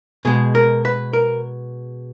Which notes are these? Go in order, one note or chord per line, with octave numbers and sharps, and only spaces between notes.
B2 G#3 G#4
A#4
B4
A#4